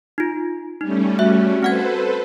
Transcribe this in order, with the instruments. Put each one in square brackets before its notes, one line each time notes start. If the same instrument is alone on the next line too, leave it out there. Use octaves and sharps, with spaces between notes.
[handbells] D#4 F4
[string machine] G3 A3 C#4 [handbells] D#4
[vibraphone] F#4 [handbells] E5
[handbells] C4 F#5 G#6 [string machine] A4 B4 C5